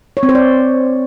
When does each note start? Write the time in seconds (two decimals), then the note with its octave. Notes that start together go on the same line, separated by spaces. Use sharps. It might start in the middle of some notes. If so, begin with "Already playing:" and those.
0.17 C#5
0.23 C4
0.29 C5
0.35 D5